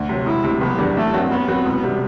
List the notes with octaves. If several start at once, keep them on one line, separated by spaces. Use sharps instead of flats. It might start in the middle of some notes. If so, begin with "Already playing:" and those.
Already playing: D2
C3 F#3
E1 E4
D2 C3
F#1 B3
E2 D3 G3 D4
A1 A3
G2 F#3 C4 F#4
F#2 B3
F#3 C4 F#4
E1
C3 G3